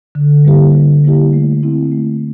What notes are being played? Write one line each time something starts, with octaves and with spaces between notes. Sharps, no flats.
D3
G3 A#3 E4 G4
D3
G3 A#3 E4 G4
A3
C4 E4
A3